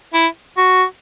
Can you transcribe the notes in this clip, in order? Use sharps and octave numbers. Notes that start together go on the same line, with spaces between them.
E4
F#4